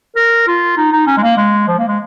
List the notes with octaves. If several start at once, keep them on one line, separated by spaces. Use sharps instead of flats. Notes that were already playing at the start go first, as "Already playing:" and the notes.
A#4
F4
D#4
D#4
C#4
G#3
A#3
G#3
F3
A#3
G#3